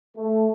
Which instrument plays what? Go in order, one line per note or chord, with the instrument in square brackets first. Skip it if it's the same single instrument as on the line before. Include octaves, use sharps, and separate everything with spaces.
[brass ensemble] A3